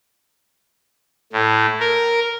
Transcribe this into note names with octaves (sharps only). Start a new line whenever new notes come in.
A2
A#4